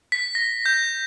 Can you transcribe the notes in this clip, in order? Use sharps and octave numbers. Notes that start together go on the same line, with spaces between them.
B6
A#6
G6